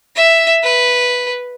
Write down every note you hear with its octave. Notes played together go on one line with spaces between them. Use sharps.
E5
B4